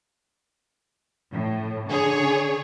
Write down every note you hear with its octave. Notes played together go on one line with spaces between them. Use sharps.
A2
D3 G#4 C#5